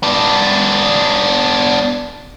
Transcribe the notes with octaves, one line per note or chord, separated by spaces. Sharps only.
B3 D4